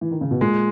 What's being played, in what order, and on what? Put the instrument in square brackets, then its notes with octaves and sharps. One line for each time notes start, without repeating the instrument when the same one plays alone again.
[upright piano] E3
D#3
C#3
B2
[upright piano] A#2 [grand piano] G#3